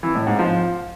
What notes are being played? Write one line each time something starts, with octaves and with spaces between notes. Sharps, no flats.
E3
A2
G#2
F3